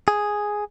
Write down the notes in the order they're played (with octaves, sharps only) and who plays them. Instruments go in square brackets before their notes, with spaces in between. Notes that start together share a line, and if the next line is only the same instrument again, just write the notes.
[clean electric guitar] G#4